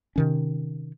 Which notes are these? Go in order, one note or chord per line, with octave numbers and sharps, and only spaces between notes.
C3 D#3 C#4